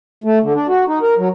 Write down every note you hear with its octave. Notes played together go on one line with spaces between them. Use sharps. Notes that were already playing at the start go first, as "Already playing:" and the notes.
A3
D3
D4
F#4
D#4
A#4
F#3